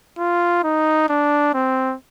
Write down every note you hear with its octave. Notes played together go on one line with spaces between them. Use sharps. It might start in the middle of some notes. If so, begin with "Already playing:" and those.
F4
D#4
D4
C4